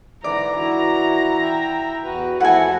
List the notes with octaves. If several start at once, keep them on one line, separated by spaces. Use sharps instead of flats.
G#2 D3 E3 D5 A#5
E3 E4 F#4
E5 G5
E2 F#4 B4
F3 A3 B3 E4 F#4 A4 F#5 G#5